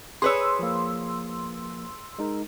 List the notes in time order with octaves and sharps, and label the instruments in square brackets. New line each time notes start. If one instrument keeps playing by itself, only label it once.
[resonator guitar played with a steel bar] G#4 B4 C#5 [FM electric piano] C6 E6
[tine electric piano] F3 A#3
G#3 D#4 A#4